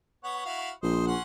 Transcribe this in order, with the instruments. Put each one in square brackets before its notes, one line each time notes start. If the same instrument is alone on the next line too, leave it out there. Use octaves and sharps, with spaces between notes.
[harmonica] B3 C#5 F#5
E4 F#4 F5
[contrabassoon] A#1 [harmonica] C5 D#5
[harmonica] C#4 F#5 C6